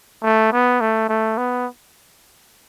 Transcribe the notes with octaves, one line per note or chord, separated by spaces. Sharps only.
A3
B3
A3
A3
B3